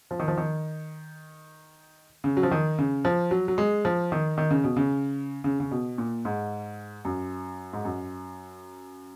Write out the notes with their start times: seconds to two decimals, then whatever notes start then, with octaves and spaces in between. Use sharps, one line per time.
0.11 F3
0.19 D#3
0.28 F3
0.37 D#3
2.24 C#3
2.37 F#3
2.43 F3
2.51 D#3
2.78 C#3
3.05 F3
3.31 F#3
3.48 F#3
3.58 G#3
3.85 F3
4.12 D#3
4.38 D#3
4.50 C#3
4.64 B2
4.76 C#3
5.44 C#3
5.60 C#3
5.71 B2
5.98 A#2
6.25 G#2
7.05 F#2
7.73 G#2
7.85 F#2